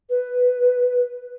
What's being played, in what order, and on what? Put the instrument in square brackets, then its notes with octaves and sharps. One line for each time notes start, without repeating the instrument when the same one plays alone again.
[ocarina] B4